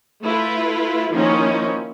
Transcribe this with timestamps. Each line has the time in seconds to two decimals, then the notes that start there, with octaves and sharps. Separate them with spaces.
0.22 A3 E4 F4 B4
1.11 D#3 F3 A#3 C#4 D#4 E4